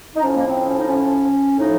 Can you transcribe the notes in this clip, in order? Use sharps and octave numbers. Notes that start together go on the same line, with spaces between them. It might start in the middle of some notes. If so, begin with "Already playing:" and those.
D#4
A2 F3 C#4
A#3
C4
C#4
D#4
C#4
A2 F3 D#4